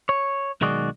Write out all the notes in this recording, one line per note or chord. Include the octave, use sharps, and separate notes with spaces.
C#5
B1 D#3 G#3 F#4 G#4 D5